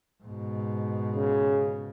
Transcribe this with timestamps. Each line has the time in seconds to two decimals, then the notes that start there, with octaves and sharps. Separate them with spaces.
0.24 G#2 B2
1.15 C#3